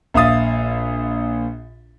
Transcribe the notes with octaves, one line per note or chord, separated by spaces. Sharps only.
A#1 E5 F5 D#6 A6